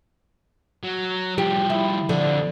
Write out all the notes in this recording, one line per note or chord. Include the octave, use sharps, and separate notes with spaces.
F#3
F3 G3 G4
E4
F2 D3